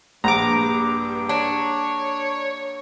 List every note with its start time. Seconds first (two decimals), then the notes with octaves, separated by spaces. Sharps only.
0.24 A#1 G2 A#5 D6
1.29 D4 C#5